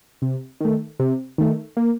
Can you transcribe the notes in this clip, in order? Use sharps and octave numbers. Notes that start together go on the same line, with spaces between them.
C3
D#3 A3
C3
D#3 A3
A#3